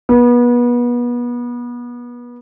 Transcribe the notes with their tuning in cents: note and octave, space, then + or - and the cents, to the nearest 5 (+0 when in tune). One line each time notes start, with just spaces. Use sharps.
B3 -30